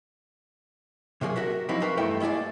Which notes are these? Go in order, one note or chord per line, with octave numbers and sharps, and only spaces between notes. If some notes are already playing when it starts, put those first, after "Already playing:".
C3 F#3 A#3 G#4
F#4 A#4 E5
F3 F#3 C4 D#4 E4 G4
F#4 A#4 B4 F5 G5 A#5
E2 G2 A3 E4 G5
G#3 A#3 E4 G#4 D5